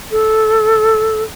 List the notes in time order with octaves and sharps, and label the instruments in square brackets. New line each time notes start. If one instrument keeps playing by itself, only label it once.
[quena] A4